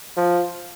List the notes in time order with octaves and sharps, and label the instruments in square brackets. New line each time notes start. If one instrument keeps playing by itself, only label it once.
[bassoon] F3